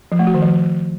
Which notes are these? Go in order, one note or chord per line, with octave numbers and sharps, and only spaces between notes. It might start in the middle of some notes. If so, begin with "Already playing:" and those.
F3
A3
F#4
D#3
F3